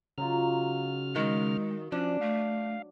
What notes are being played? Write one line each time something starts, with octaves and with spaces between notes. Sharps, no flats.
C#3 F#3 D#4 F4 F6
D#3 G#3
F3 C#4 D4
A3 F5